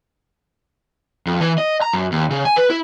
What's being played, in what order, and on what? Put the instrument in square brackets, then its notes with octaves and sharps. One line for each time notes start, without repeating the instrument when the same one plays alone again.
[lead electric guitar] F2
E3
D#5
A#5
F#2
D#2
C#3
G#5
B4
E4